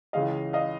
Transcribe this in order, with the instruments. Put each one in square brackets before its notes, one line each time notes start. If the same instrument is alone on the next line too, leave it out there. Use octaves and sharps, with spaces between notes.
[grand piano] C#2 C#3 E3 G#3 C#4 [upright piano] D#5 F5
[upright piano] D#5 F5